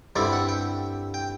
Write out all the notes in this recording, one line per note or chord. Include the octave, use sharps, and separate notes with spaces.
G2 D3 G3 C4 E4 D5
F#5
G5
G5